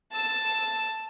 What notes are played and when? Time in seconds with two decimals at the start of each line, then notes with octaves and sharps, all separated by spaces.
0.12 A5 E6